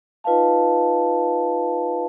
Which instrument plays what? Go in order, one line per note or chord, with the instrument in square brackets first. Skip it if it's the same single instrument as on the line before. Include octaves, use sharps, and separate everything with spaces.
[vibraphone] D#4 F4 B4 D#5 F5 A5